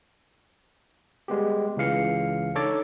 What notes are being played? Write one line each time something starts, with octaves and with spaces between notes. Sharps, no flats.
G3 G#3 B3 G4
C#2 C#3 E3 F5 C#7
D4 D#4 A4 C#5 D6 A6